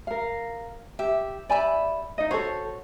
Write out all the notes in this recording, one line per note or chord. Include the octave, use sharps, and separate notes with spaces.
A#4 F5
G4 E5
G4 D5 E5 G#5 B5
D#4 D#5
F#4 A4 C5 C#5